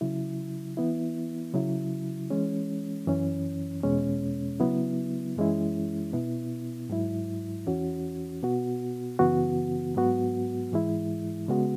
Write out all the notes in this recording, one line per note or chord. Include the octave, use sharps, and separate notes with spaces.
C#3 F#3 E4
E3 B3 E4
C#3 F#3 E4
E3 G#3 C#4
F#2 E3 C#4
E2 B2 G#3 C#4
C#3 F#3 B3 E4
F#2 E3 G#3 C#4 E4
B2 B3 E4
G#2 F#3 E4
E2 E3 C#4 F#4
B2 B3 F#4
F#2 C#3 E3 B3 F#4
G#2 F#3 B3 F#4
G#2 E3 G#3 E4
C#3 G#3 B3 F#4